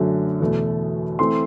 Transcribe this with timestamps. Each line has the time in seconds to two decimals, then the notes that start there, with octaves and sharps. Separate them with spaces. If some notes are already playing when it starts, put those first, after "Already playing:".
Already playing: F#2 D3 F#3 A3
0.41 E2 B2 A3
1.19 E3 A3 C4 C6